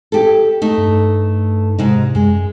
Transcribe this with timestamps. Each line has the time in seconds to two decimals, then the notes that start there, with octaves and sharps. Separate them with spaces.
0.12 G4 A4
0.62 A3 D#4
0.78 G2
1.78 G#2 C3 D#4
2.15 F#2 G#3